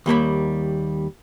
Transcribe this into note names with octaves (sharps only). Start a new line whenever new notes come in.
D#2 G3 A#3 B5